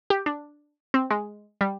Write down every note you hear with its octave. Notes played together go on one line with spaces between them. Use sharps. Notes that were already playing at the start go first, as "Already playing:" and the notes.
G4
D4
C4
G#3
G3